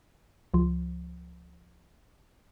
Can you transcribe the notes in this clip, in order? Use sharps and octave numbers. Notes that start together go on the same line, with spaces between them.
C#2 F3